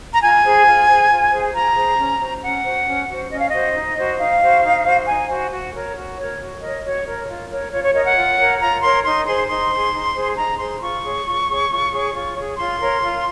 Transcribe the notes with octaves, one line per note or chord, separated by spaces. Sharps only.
A#5
F4 G#5
G#4 C5
F4
G#4 C5
F4
G#4 C5
F4 A#5
G#4 C5
C#4
F#4 C5
C#4 F#5
F#4 C5
C#4
F#4 C5
C#4 D#5
F5
F#4 C5 D#5
D#4
F#4 C5
D#4 F5
F#4 C5
D#4
F#4 C5
D#4 G#5
F#4 C5
F#4
A#4 C#5
F#4
A#4 C#5
F#4
A#4 C#5 D#5
F#4 C#5
A#4 C#5
F4
A#4 C#5
F4 C#5
C#5
A#4 C#5 D#5
F#5
F4
A#4 C#5
F4 A#5
A#4 C#5 C6
D#4 C6
G#4 C5 C6
D#4 C6
G#4 C5
D#4
G#4 C5
D#4 A#5
G#4 C5 C6
F4 C#6
G#4 C#5
F4
G#4 C#5
F4
G#4 C#5
F4
G#4 C#5
F4 C6
A#4 C#5
F4